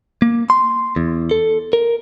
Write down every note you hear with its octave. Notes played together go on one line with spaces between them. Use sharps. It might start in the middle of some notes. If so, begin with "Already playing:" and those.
A#3
C6
E2
A4
A#4